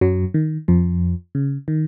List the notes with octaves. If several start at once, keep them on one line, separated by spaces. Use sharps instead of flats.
F#2 F#3
D#3
F2 F3
C#3
D#3